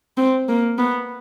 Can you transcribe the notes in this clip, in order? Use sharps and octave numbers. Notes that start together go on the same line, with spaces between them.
C4
A#3
B3